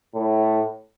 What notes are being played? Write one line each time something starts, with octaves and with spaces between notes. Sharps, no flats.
A2